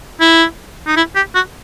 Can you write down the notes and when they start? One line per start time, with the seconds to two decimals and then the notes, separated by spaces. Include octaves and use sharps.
0.21 E4
0.86 D#4
0.96 E4
1.16 G4
1.35 F#4